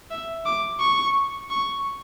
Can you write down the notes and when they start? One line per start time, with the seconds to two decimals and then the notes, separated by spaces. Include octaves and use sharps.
0.10 E5
0.45 D6
0.80 C#6
1.50 C#6